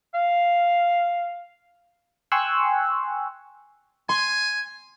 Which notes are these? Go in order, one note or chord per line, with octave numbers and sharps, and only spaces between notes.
F5
G5 G#5 C6 C#6 E6 F#6
G#5 C6